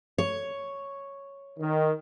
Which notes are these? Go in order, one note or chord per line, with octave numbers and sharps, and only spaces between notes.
C#5
D#3